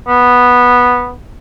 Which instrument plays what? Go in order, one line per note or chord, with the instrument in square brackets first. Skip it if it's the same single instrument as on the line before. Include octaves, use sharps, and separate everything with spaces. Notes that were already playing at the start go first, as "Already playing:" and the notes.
[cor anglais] B3